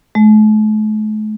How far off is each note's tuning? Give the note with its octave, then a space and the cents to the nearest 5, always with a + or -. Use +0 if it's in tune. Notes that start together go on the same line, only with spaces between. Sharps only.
A3 -45